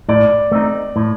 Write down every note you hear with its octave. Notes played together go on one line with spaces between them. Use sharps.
A2 D5
A3 C4 D#4
A2